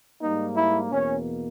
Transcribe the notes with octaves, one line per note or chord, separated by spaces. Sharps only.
G#2 G3 A#3 D#4
E4
E2 B2 A#3 C#4